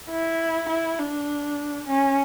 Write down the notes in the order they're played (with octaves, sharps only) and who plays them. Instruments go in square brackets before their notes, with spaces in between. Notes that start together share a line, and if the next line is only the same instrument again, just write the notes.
[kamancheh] E4
E4
D4
C#4